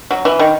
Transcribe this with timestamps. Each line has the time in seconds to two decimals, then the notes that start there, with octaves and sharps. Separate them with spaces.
0.11 F#3
0.25 E3
0.39 D#3